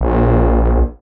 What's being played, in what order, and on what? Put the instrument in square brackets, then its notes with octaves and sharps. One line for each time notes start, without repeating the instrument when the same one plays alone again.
[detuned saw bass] A#1